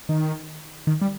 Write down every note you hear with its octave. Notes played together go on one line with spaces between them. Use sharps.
D#3
D#3
G3